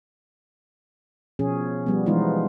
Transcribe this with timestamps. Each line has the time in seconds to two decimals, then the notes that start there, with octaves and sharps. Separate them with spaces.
1.39 B2 F3 C#4 G#4
1.86 F3 G3 B3
2.06 E3 F3 G#3 B3 D#4 F4